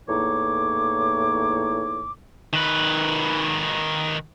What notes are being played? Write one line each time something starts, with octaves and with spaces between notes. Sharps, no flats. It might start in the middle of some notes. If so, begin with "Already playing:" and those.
E2 A2 A#3 D#4 C#5 D6
D#3 B4